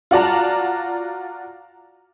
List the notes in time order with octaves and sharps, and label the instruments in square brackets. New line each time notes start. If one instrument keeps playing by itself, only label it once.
[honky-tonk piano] F4 F#4 D5 A5 A#5